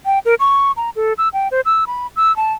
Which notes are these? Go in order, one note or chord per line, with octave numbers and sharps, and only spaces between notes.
G5
A#4
C#6
A#5
A4
E6
G5
C5
E6
B5
E6
A5